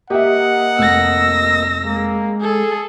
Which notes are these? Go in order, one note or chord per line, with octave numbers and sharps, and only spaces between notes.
A#3 G4 D#5 E5 F#5
F1 E6 A#6
G#3 A#3
G#4 A4